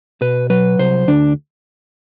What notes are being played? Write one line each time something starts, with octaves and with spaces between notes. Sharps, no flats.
B2 B4
F#3 B4
C2 C5
D2 D4